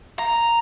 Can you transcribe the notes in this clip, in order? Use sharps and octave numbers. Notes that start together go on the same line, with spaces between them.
A#5